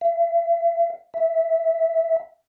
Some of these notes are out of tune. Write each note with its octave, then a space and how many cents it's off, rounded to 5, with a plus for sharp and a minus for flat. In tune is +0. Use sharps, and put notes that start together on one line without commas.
E5 +40
E5 -5